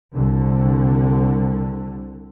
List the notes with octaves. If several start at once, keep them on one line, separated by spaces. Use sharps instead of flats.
C2 D3